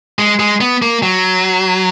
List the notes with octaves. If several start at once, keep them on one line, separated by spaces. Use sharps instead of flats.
G#3
G#3
B3
A#3
F#3